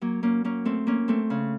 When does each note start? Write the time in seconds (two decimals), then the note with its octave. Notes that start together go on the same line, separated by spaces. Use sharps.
0.01 F#3 A#3
0.23 A#3 C#4
0.44 A#3 C#4
0.65 A3 C4
0.87 A#3 C#4
1.08 A3 C4
1.30 C#3